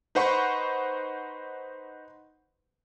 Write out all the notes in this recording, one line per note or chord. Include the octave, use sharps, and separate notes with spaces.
D#4 B4 C5 F#5 B5 C#6